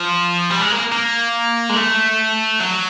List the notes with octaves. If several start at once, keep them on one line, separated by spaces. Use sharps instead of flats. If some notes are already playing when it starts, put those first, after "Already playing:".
Already playing: F3
G3
G#3
A#3
A#3
G#3
A3
F#3